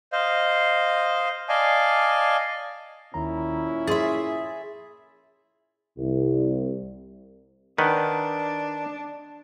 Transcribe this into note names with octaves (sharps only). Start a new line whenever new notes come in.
C5 D#5 F5
D5 D#5 F5 G#5 A5
D#2 A#2 D#3 C#4 E4 A#5
G#4 E5 C6 A6
C2
D#3 D4 B4 F#5